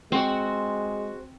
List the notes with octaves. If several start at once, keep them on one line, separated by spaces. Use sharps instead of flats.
G#3 C4 F#4 C5